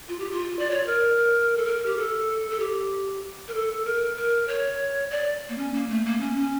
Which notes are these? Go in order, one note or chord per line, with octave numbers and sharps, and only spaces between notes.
F4
G4
F4
D5
C#5
A#4
A4
A#4
G4
A4
A4
G4
A#4
A4
A#4
A#4
C#5
D5
A#3
C#4
A#3
A3
A#3
C#4
C#4